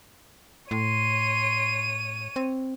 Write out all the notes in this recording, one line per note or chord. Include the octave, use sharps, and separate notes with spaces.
A2 C#5 C6 D#7
C4